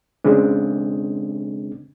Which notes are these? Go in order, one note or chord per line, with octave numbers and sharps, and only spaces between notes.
C#3 G#3 C4 D4